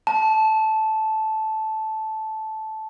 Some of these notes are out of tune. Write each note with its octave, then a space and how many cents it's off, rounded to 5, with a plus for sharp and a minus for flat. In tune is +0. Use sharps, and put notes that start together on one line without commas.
A5 -10